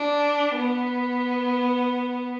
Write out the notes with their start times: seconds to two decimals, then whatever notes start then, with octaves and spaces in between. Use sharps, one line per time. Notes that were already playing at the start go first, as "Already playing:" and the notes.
Already playing: D4
0.55 B3